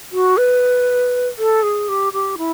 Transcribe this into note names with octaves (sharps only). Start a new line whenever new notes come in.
F#4
B4
A4
G#4
G4
G4
E4